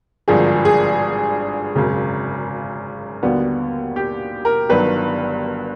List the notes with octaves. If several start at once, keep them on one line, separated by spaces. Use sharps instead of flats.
G#1 G2 D3 F3 G#4
G#4
G#1 F#2 C#3
D#2 D3 G3 B3 F#4
G4
A#4
G1 G2 D#3 F#3 B4